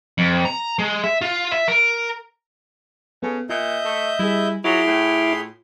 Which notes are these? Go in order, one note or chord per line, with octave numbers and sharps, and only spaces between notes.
F2
A#5
G#3
E5
F4
E5
A#4
C#3 B3 A4
A#2 F4 D#5 E5 G6
A3
G3 E4 G#4
F#3 E4 F4 G#4 B5 C6 D6 F6
A2